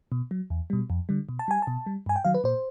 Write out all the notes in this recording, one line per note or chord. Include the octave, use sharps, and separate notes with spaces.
B2
F#3
E2
B2 G3
F2
D3 G3
B2
A5
G3 G#5
B2 A5
G3
G2 G#5
G5
D#3 F#3 F5
B4
A#2 C5